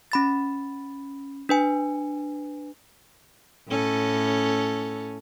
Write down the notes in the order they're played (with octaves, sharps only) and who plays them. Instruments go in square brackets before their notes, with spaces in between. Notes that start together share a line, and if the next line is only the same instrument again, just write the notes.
[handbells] C#4 B5 A6
D4 B4 G#5
[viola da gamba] A2 C#4 A4